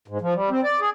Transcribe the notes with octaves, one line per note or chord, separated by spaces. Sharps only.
G#2
F3
G3
C4
D5
G#4